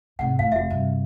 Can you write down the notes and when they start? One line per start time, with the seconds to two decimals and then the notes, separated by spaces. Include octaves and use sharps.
0.19 G#2 C3 F#5
0.39 A2 F5
0.52 F1 F#4 E5
0.70 G2 C3